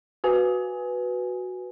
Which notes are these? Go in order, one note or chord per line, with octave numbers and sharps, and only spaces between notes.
F#4 B4 G#5